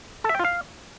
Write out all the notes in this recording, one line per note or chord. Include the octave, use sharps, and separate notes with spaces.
A4
E5
G5
F4
F5